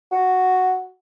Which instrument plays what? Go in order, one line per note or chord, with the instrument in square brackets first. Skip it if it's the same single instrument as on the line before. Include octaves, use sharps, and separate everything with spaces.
[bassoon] F#4